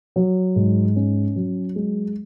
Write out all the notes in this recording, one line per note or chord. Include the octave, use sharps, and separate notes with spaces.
F#3
G#2
C#4
F#3
G#3